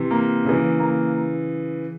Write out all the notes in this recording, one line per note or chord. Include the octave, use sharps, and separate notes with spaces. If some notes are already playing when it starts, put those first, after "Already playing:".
Already playing: C3 E3
A#3
C#3 E3
A#3